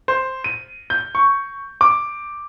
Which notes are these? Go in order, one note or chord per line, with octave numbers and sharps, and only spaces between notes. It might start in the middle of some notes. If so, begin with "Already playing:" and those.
C5
D#7
G6
C#6
D6